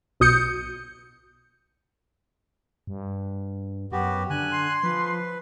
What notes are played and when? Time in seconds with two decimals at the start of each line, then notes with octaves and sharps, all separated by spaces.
0.20 B1 B2 D#6 G6 C#7
2.87 G2
3.92 F#2 B3 F#4 G4
4.30 D3 G#5 F#6
4.52 C6
4.83 F3 B4